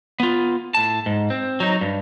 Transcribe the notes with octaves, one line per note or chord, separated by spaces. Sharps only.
B3 F4
A2 A5
G#2
C4
F#3 D#4
G2